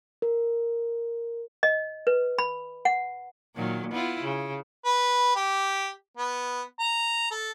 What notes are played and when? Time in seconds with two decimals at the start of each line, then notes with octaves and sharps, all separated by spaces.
0.22 A#4
1.63 D#5
2.07 B4
2.38 B5
2.85 F#5
3.55 A#2 D#3 F#3
3.92 B3 E4 F4
4.23 C#3
4.85 B4
5.36 G4
6.17 B3
6.80 A#5
7.31 A4